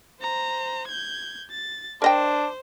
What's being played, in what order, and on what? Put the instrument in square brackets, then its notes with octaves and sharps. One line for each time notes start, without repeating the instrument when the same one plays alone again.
[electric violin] C5 A#5
G6 G#6
A6
[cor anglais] D4 [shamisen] A#4 D#5 G5 [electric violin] C5